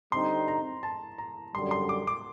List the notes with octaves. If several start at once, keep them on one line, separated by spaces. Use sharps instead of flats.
D3 G3 C4 D#4 C6
A#5
A5
A#5
F#2 D3 G3 C6
C6
D6
D6